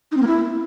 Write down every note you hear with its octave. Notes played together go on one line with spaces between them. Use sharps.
D#4
C4
A#3
E4